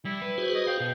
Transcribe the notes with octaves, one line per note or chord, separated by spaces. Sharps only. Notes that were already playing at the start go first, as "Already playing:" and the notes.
G3 E4
B4
F#4 G#4 C5
D#5
F5 G5
B2